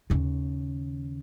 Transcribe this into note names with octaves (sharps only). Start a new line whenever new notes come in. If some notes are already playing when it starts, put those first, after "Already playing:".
D#2 C#3